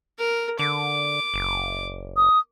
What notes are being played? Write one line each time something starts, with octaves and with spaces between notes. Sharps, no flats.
A#4
D3 D6
F#1
D#6